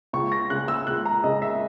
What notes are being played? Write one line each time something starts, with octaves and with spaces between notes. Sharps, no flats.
C#2 C#6
A#6
C#3 G#3 F#6
E6
C#2 F#6
A#5
C#3 G#3 D#5
E5